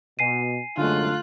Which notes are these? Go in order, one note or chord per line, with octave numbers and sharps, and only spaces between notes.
B2 G#5 C7 D#7
C2 F#2 D3 G#3 A3 F4 F#6